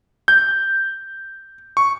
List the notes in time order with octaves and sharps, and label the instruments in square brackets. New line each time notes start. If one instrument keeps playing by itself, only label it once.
[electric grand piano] G6
C#6